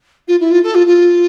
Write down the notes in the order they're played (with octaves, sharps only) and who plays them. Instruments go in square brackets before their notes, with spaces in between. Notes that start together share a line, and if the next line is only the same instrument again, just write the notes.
[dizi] F4
E4
F4
A4
F4
F4